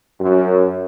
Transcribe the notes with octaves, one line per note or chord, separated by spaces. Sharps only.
F#2